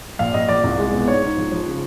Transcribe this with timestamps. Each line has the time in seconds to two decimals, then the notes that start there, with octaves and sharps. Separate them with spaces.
0.19 A#1 F5
0.34 A#1 D#5
0.49 A#1 D5
0.64 C2
0.78 G#3
0.93 B2
1.08 G#2 C#5
1.22 G#2
1.37 F3
1.52 F3
1.66 C#3